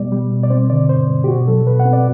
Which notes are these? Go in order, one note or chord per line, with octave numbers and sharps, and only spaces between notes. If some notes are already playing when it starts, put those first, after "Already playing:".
Already playing: B2 G3 B3 D5
G3
B2
D5
C4 C5
D3 D5
G2 C5
G2
G4
B2 F#4
F#3 A4
B2 B4
F#5
C4
D5